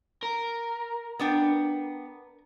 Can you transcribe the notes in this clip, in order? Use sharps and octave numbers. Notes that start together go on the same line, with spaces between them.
A#4
B3 D4 G5